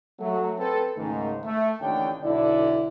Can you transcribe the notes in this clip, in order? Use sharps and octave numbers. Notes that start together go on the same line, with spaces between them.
F#3 A3
C4 A4 B4
C#2 G#2 D#3 A3
A3 E5
A1 D#2 D3 D4 C#5 G5
B1 D3 E4 D5